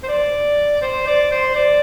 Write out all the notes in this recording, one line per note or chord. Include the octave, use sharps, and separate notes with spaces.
C5
D5
C5
D5
C5
D5